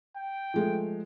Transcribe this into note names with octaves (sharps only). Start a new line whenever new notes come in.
G5
F3 G#3 A3